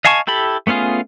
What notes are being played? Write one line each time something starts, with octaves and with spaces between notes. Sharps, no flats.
D#5 F5 G#5 A5 C#6
E4 G4 A4 B5
A3 B3 C#4 F4 G#4